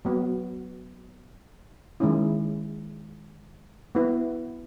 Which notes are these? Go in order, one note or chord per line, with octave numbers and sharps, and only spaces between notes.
F#3 B3 F#4
D#3 G#3 C#4 E4
B3 E4 B4